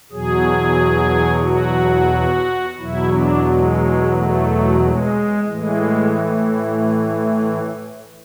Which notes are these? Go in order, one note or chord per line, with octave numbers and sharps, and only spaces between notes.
E2 B2 F#3 G#4
F#4
E2 B2 F#3 E4
D4
G#3
A3
G#3
A2 E3 G#3